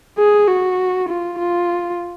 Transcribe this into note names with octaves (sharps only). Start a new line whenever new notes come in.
G#4
F#4
F4
F4